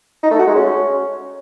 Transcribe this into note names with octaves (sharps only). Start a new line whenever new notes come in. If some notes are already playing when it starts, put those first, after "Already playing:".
D#4
A3
F#4
G#3
C#4